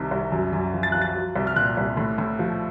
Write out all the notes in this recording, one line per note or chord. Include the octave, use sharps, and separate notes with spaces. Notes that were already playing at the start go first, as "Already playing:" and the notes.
Already playing: C2 C3 D#3
C2
F#2
F#2
F3
A6
F3 F#6
A6
F#3
C2
F6
A#2 F#6
C2
A2
A2
F3